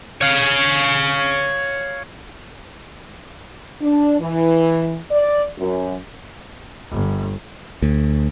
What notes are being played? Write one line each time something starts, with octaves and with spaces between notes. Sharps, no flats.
C#5 F5
D4
E3
D5
F#2
G1
D2